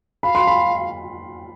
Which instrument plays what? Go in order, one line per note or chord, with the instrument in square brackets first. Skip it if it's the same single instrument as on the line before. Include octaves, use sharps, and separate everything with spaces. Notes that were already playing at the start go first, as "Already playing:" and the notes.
[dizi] F5 [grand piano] B5
[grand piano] C6
B5